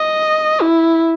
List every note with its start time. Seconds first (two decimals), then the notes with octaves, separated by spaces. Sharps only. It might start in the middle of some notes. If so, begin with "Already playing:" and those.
Already playing: D#5
0.62 E4